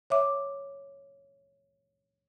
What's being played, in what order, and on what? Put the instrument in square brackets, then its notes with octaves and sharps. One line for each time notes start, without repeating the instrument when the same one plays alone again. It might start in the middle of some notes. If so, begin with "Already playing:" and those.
[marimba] C#5 E5 D6